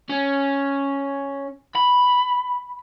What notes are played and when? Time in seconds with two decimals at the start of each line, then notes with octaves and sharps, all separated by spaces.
0.09 C#4
1.75 B5